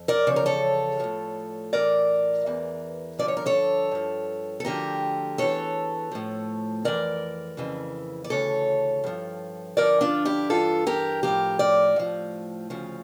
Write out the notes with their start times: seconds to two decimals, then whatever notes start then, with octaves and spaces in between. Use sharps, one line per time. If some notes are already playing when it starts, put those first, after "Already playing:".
Already playing: F2
0.08 A#4 D5
0.27 E2 C#3 F3 C#5
0.36 A#4
0.46 A4 C#5
1.00 A2 F3
1.73 A2 E3 A#4 D5
2.46 E2 E3
3.19 G2 D3 F3 D5
3.28 C#5
3.37 A#4
3.46 A4 C#5
3.92 G2 F3
4.60 A4
4.65 D2 D3 F3 G4 A#4
5.38 E2 E3 A4 C#5
6.11 A2 F3
6.85 F2 E3 A#4 D5
7.57 F2 C#3 E3
8.24 D5
8.30 D2 C#3 E3 A4 C#5
9.04 G2 F3
9.77 G2 D3 F3 A#4 D5
10.01 D4 F4
10.25 E4 G4
10.50 G2 E3 F4 A4
10.87 G4 A#4
11.23 A2 F3 G4 A#4
11.59 A#4 D5
11.96 A2 F3
12.70 D2 C#3 F3